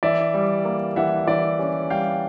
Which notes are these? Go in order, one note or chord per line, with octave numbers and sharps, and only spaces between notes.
E3 D5 E5
G3
A#3
E3 E5 F#5
E3 D5 E5
C#4
G3 F5 G5